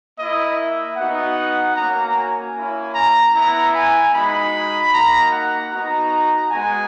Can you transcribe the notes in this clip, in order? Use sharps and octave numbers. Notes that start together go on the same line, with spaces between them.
A#3 E4 D#5
E5
B3 D#4 F#4 F#5
A#3 C#4 F#4 A#5
G#5
A#3 C#4 E4
A#5
B3 E4 A#5
G#5
G#3 D#4 F#4 B5
A#3 D#4 F#4 A#5
F#5
B3 D#4 F#4 A#5
G#3 B3 F#4 G#5